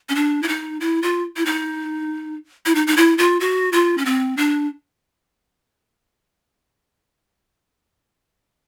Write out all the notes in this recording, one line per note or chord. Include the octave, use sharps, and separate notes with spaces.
C#4
D4
E4
D#4
E4
F4
E4
D#4
E4
D#4
D#4
E4
F4
F#4
F4
C#4
C4
D4